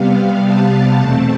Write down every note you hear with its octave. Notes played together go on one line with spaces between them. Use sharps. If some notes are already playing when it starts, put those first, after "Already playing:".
Already playing: C3 G3 B3 F5
A5
E2 B2 A3 C4